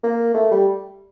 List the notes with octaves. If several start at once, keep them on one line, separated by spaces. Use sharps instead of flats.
A#3
A3
G3